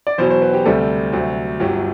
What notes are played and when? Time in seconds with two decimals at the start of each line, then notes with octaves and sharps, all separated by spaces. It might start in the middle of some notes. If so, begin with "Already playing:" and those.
0.07 D5
0.18 E2 B2 F#3 C5
0.30 C5
0.42 B4
0.53 G4
0.65 D2 C3 G3 A4
1.13 D2 C3 F#3
1.60 G1 F#2 F#3 G4